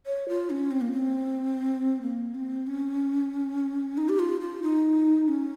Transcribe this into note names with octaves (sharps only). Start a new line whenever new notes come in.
C#5
F4
C#4
C4
A#3
C4
A#3
C4
C#4
D#4
G4
F4
F4
D#4
C#4